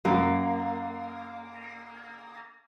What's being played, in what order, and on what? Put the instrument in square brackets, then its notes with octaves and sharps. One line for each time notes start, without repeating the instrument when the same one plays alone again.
[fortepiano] F#2 [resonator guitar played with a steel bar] A#3